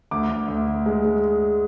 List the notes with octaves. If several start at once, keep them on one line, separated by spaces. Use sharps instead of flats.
D2 D6
D2
D2
D2
G#3
G#3